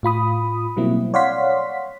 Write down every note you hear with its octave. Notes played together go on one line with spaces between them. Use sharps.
A2 F4 B5 D#6
B2 F#3 G3 A#3 C4 E4
C#5 D5 F5 F#5 C6 B6